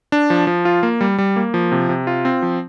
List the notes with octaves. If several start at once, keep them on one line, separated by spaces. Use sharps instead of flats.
D4
F3
F3
F4
A#3
G3
G3
A#3
F3
C3
C3
F4
C4
F3